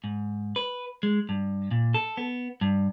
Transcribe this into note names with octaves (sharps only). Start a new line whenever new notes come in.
G#2
B4
G#3
G2
A#2
A4
B3
G2